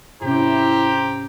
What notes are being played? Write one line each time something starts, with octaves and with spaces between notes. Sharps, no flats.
G#2 C3 C#4 E4 G4 C5 A#5